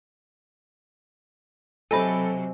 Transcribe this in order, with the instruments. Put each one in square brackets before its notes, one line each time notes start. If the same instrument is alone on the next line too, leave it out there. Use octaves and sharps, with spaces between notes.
[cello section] C3 F#3 [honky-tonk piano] A4 B5 [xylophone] C5 D#5 G#5